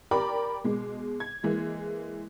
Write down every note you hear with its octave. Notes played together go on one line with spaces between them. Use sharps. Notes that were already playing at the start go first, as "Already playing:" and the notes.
G4 A#4 D5 G5 B5 D6
B2 G#3
G#6
E3 G#3 A#3